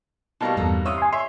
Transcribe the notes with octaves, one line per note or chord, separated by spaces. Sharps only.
B2 G3 A#3 A5 C#6
E2 G2 D#4 A4 A#5
C3 C#5 E5 F5 B5 D#6
G#5 C6
C#5 E5 C6